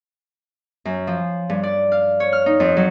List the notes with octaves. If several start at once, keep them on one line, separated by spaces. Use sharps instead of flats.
F#2
F3
G2
D5
F5
C#5
F6
D#4
F2
F#3